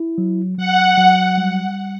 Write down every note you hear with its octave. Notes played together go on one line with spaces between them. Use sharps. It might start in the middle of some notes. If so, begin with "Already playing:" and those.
Already playing: E4
F#3
F#3 F#5
F#3
G3